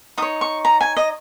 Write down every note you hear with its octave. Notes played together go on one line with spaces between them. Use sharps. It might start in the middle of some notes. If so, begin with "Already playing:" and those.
D#4 C#5 D#6
C#6
A#5
G#5
D#5